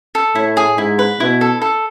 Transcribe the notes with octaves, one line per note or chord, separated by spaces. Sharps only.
A4
A2 E4
G#4
G#2 E4
B4
B2 E4
A4
A4